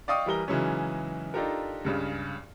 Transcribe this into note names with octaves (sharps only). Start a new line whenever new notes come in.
D5 D#5 F5 G5 C#6 D#6
E3 G3 A#4 G7
C#3 E3 F#3 G#3 C#4 D#4
D4 D#4 F4 G4 A4 A#4
C#2 G2 C#3